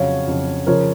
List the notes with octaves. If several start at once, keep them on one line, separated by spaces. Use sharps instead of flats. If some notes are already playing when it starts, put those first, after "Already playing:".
Already playing: F2 C#3 F#3 C#5 F5
F2 C#3 F#3
C#3 F3 A#4 C#5